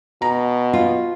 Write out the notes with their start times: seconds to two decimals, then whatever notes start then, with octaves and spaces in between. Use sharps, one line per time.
0.22 B2 A#5
0.73 F4